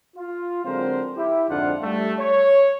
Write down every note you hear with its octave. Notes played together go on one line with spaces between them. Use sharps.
F4
D3 F#3 G#3 C4 A#4 C5
E4 G4
F2 G#2 D3 D4 F4 F#5
G3 A3
C#5